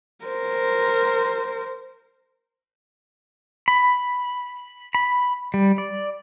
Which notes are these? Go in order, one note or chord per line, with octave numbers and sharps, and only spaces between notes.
A#4 C5
B5
B5
G3
D5